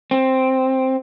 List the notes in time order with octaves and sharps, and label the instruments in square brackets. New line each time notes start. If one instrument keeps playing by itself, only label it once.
[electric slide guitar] C4